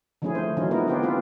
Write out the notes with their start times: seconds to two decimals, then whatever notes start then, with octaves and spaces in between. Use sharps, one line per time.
0.22 D3 F3 A3 C#4 E4 G#4
0.35 A3 C5
0.57 E3 F#3 C#4 D#4 F4
0.71 D3 G#3 B3 D#4 E4 A#4
0.87 B3 C#4 F4 G4 C5
1.03 D3 A#3 C4 F4 A4 B4